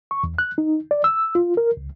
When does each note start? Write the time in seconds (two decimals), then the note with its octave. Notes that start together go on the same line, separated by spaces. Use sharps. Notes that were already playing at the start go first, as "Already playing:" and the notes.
0.11 C#6
0.24 E2
0.38 F#6
0.58 D#4
0.91 D5
1.04 E6
1.35 F4
1.57 A#4
1.77 C#2